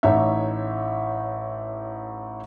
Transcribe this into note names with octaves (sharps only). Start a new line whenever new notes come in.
A1 A2 D#4 C#5 E5